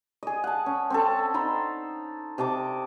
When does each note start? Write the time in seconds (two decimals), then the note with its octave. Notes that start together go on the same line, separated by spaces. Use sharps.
0.23 G#4 D#5
0.44 F#5 A5
0.66 C#4
0.90 C4 C#4 A4
1.34 D#4 C5 B5
2.38 C3 D#5 A5 D6